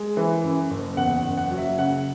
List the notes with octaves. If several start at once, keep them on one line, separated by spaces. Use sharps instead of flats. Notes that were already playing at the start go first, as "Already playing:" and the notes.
Already playing: G#3
E3
F#2
F#1
E2 F#5
F#5
F#1
F#5
F#3
E5
C#3 F#5